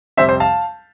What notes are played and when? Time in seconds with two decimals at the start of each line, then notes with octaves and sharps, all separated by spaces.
0.17 F2 C3 G3 C4 C5 E5
0.29 C5
0.40 F5 A5